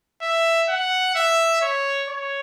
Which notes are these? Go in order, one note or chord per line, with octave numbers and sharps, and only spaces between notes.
E5
F#5
E5
C#5
C#5